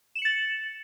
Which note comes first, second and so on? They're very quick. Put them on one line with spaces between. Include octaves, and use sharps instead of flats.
E7 F#7 C#7 A6